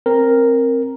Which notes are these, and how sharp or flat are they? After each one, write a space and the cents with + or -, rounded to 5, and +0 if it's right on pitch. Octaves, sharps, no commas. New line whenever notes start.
C4 +15 A#4 +0